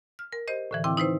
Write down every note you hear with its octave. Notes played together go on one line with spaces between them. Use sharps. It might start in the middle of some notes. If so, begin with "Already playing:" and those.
F6
A#4
G4 C5 D#5
A2 D3 E3
D#3 C4 E4 G5 D6
D#4 E4 B4 C5